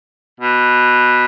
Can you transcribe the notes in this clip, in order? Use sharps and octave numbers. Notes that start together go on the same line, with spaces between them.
B2